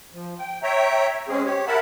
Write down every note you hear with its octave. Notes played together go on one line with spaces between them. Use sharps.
F3
G5
C#5 E5 G5 A#5
G#3 C4 C#4 G#4
G4 C#5
A#4 E5 F#5 A5 B5